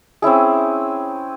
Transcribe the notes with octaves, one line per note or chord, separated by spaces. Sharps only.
C4 C#4 E4 G#4